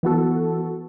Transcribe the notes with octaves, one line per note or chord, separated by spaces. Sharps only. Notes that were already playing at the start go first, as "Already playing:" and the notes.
E3 B3 F#4 A4